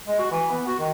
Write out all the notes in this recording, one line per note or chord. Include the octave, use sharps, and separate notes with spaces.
G#3
F#4
E3
B3
F#4
D#3